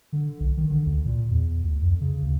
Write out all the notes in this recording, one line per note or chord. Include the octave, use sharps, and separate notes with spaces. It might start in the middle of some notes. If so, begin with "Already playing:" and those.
D3
B1
D#3
D3
D2
A#2
E2
D2
F2
C#3
D2